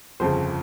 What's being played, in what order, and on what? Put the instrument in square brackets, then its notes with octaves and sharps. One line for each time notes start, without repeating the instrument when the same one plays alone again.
[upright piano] G1 F2 C#3 C5